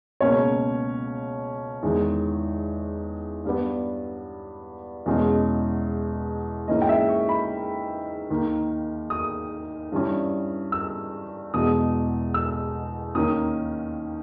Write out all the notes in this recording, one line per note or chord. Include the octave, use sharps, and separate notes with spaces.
C#2 B2 A#3 C#4 C#5
E2 D#3 G#3
G2 G3 B3
E2 B2 G#3 C#4
G#2 E3 A#3 C#4 D#5
G5
E5
C#6
B5
D#2 D#3 A#3
D#6
G2 E3 G3 C#4
E6
E2 B2 G#3 D#6
E6
D#2 D#3 A#3 C#4 D#6